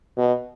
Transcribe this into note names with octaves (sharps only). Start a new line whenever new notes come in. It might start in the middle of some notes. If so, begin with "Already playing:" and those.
B2